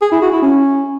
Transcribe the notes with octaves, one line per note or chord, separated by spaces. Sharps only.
G#4
E4
F#4
E4
C#4